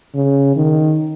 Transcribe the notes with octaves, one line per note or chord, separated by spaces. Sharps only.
C#3
D#3